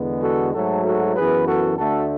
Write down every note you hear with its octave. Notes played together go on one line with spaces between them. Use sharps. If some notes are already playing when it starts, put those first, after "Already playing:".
Already playing: E2 D3 G#3 B3
F#4 A4
G#2 F#3 A3 F#4 A4
F#4 A4
F#2 E3 B3 G#4 B4
F#4 A4
D2 D3 A3 F#4 A4